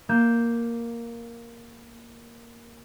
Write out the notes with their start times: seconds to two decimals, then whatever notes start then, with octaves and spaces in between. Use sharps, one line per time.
0.09 A#3 G6 E7